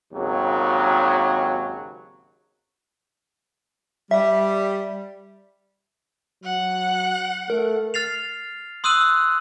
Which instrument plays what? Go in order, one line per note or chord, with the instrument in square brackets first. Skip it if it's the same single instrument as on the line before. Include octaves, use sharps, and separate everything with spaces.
[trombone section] G#1 D#2 C#3 F#3
[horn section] G3 [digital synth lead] E5
[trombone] F#3 [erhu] F#5
[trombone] A3 [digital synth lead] A#4
[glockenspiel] F6 A6 C7 F7
C6 D#6 E6 F#6 D#7 F#7